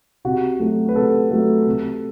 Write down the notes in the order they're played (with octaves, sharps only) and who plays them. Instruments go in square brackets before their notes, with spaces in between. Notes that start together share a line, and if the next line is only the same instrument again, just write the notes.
[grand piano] C3 F#4
F#3 A3
B4
C3 A4
F#3 A3
C3